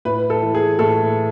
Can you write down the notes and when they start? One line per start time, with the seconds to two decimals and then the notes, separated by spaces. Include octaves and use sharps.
0.05 A2 B4
0.30 A4
0.42 E3
0.54 G#4
0.79 A2 A4